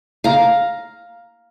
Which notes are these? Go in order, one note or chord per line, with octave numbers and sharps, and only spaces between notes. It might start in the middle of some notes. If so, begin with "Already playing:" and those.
F5 A#5